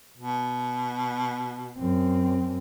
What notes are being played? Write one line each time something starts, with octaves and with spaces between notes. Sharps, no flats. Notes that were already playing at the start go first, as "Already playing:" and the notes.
B2
F#2 C4